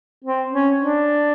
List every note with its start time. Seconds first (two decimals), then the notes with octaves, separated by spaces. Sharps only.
0.24 C4
0.51 C#4
0.79 D4